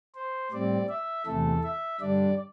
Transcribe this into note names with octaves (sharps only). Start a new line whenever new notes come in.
C5
A2 G3 C4 D5
E5
E2 C3 E3 A3 A4
E5
G2 D3 G3 D4 D5